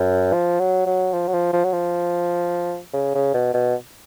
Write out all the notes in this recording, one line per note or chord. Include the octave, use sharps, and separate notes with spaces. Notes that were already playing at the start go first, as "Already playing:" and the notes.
Already playing: F#2
F3
F#3
F#3
F3
F#3
F3
F3
F#3
F3
C#3
C#3
B2
B2